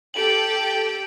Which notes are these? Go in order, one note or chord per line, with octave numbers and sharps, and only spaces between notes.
G4 A4 G5 D7 F#7